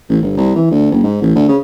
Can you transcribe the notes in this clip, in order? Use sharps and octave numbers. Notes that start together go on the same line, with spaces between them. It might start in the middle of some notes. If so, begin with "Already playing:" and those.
A1
G1
C2
E3
D2
F#1
G#2
A1
D2
C#3